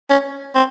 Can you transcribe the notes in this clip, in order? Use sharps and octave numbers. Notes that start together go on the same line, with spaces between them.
C#4
C4